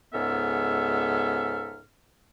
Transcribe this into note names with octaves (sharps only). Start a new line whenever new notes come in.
C#2 G#2 B3 A4 E5 F6